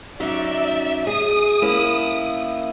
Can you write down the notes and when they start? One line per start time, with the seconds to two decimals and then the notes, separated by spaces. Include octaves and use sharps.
0.20 F#3 C#4 D#4 D5 E5
1.07 G#4 D#6
1.62 A#3 C#4 E4